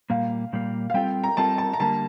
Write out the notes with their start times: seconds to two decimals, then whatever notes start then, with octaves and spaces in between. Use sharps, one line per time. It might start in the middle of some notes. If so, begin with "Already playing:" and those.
0.10 A#2 G3 A#3 F5
0.53 A#2 G3 A#3
0.90 F5
0.94 G3 C4 F4 A4 G5
1.24 A#5
1.37 G3 C4 F4 A4 A5
1.58 A5
1.73 A#5
1.80 D3 G3 A#3 A5